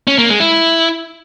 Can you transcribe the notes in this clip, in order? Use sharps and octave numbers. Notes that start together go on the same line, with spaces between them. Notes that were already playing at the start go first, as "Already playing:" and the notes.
C#4
A#3
G#3
E4